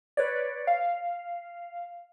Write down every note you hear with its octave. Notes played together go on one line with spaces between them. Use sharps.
B4 C#5 D5
F5